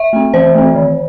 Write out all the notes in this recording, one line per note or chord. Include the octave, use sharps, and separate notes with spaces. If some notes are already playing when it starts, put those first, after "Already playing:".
Already playing: E5
A3 C4
E3 C5
A3 C4
D#3